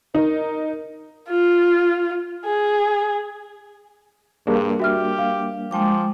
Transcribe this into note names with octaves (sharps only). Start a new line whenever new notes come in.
D#4 A#4
F4
G#4
G2 G3 A#3 D4 G#4
F#4 G4 E5 F6
F5
F3 G#3 G5 D6